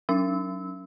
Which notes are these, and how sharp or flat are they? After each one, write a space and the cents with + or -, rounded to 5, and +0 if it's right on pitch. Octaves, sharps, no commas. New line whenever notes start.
F#3 +0 C#4 +15 E6 -20